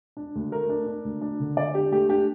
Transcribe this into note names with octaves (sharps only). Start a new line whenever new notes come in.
D4
D2
A3 A#4
D4
D4
D2
D4
D3
D3 D5
D4 G4
A3 G4
D4 G4